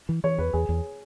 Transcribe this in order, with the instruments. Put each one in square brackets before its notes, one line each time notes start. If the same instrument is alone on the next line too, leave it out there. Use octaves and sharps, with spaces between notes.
[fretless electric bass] E3
[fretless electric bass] E3 [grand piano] C#5
[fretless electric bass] E2 [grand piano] B4
[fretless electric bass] E2 [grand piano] G#4
[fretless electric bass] E2